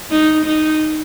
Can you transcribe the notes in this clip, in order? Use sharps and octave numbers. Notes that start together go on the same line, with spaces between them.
D#4
D#4